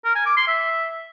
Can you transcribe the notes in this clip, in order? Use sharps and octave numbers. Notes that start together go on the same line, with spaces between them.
A#4
G#5
D6
C6
E5